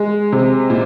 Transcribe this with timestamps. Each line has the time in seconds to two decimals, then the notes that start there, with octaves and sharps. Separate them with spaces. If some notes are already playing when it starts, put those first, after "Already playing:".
Already playing: G#3
0.32 C3
0.70 A#2